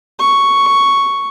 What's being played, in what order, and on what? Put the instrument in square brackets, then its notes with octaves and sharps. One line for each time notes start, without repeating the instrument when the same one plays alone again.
[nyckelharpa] C#6